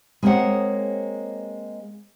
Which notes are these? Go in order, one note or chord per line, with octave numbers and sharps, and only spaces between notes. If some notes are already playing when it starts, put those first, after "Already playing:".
G#3 A#3 C4 G#4 C#5 F#5